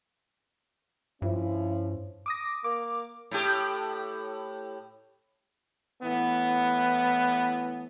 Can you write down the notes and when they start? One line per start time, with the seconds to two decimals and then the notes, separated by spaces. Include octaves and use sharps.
1.22 G2 F3 C#4 E4
2.26 D6 D#6 A#6
2.64 A#3 D6
3.31 A2 G4
6.02 A2 E3 B3